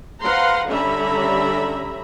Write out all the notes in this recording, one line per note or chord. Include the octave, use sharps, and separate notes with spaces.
B4 C5 F5 F#5 A#5 C6
D3 G3 C#4 E5 A#5 B5